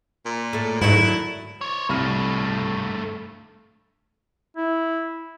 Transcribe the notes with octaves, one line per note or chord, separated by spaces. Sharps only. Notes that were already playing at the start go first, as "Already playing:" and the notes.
A#2
A2 A3
G#2 D3 D#3 F#3 E4
C5 C#5
C2 G2 A3 F6 D#7
E4